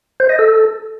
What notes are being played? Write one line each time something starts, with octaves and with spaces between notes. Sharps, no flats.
C5
D#5
A4